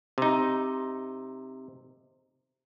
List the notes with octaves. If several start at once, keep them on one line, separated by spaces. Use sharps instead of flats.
C3 D#4